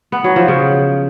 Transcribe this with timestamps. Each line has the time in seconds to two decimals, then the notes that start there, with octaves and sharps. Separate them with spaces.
0.12 B3
0.24 F#3
0.36 F3
0.48 C#3